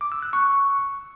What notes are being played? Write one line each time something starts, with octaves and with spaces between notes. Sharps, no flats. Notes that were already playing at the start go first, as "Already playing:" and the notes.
D6
E6
F#6
C#6